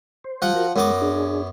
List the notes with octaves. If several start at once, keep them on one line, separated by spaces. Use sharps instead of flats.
C5
F3 G3 F#5
F4 F#4 A#4
F#2 G#3 B3 D6
D4 G#4